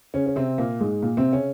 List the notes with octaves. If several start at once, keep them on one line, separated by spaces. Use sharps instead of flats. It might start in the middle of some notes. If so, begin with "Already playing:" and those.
C#3 C#4
C#4
C3 C4
A#2 A#3
G#2 G#3
A#2 A#3
C3 C4
C#3 C#4